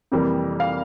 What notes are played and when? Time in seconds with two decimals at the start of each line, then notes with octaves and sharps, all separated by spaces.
0.12 F2 C3 E3 G3 A#3
0.60 F5